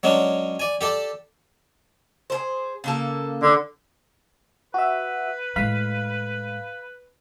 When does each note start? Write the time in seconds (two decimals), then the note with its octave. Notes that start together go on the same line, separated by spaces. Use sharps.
0.03 F#3 G#3 C#4 D4
0.60 D5 G#5
0.81 G4 A4 D5
2.30 G#4 A#4 C5
2.84 C#3 A#3 A4
3.42 D3
4.74 F#4 B4 E5
5.56 A2 G#3 F5 B5